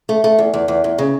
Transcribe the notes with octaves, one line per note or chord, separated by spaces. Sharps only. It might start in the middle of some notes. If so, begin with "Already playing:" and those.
A3
A3
E2
E2
E2
E2
C#3